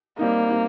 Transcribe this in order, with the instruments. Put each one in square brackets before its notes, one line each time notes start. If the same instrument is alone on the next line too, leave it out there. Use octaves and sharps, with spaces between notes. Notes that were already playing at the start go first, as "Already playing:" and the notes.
[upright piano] G3 C4 D#4 [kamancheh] A#3
[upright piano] G3 C4 D#4